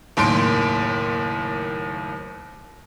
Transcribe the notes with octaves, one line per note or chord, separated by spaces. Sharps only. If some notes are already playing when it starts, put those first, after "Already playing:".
F#1 D#2 A2 C6 D7